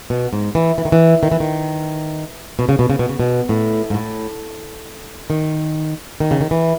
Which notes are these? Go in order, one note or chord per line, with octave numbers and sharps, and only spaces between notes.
B2
G#2
E3
E3
D#3
E3
D#3
E3
D#3
B2
C#3
B2
C#3
B2
C#3
B2
A2
G#2
A2
D#3
D#3
C#3
D#3
E3